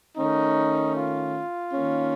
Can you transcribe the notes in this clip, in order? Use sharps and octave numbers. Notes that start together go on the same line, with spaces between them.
D#3 A3 C#4 D#4
F4
D#3 A#3 C#4